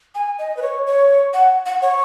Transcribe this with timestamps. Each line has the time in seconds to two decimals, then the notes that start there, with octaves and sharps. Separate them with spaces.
0.15 G#5
0.39 D#5
0.57 B4
0.62 C#5
0.87 C#5
1.33 F#5
1.66 F#5
1.82 C#5